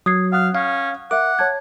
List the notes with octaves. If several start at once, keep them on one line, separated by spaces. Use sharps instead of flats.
F#3 D#6 G#6 C7
F5 F#5 D#6 F#6
C#4 F5
A#4 E5 F#5 D6
C#5 A5 G#6